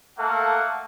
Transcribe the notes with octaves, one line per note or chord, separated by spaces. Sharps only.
A3 A#3 A4 F#5